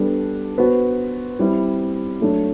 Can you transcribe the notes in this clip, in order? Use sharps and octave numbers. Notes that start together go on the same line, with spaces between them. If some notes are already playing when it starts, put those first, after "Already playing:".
Already playing: G3 B3 D4 A4
B3 F#4 C5
G3 C4 E4
F#3 A3 D4